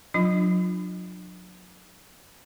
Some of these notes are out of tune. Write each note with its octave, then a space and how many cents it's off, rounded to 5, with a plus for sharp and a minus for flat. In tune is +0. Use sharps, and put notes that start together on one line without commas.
F#3 -25 D4 +30 F4 +0